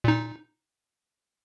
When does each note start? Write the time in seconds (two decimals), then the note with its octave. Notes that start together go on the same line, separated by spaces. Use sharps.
0.04 A#2 D#4